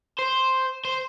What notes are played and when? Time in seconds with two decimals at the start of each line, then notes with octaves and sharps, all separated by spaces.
0.19 C5
0.85 C5